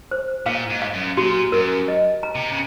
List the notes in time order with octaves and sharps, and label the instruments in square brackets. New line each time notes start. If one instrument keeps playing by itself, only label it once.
[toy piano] C5
[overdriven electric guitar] A#2 [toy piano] F5
[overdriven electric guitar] G#2
[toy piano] F5
[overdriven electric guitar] F#2
[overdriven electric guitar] A#2 [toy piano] F#4
[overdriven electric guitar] F#2 [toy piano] A#4
[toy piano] D#5
A#5
[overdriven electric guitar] C3
C#3